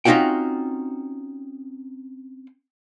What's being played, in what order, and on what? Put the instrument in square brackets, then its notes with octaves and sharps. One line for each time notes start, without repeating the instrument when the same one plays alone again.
[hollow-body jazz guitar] C4 C#4 D#4 F4 F#4 G5